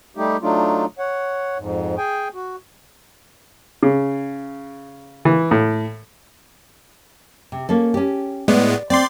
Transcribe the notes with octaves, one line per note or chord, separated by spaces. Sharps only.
G3 A3 D#4 G4
F#3 A3 D4 D#4 F4
C#5 F#5
F2 G#2
G#4 G5 G#5
F#4
C#3
E3
A2
C3
A#3 C#4 A4
C#4 G4
A2 G#3 B3 D5
C4 D5 C6